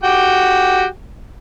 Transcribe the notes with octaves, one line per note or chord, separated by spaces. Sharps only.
F#4 G4 G5